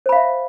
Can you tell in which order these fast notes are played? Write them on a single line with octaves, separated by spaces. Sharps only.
C5 B5 F5 E5